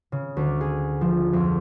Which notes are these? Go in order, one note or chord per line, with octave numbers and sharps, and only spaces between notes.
C#3
D2
G#4
F3
F2